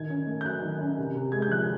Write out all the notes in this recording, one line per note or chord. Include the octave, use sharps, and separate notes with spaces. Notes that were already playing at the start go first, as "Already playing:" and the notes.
Already playing: D#3 G#6
C#4
A3
G6
F#3 F#6
D#3
C#4
C3
C3
G#3 G#6
G6
F3 F#6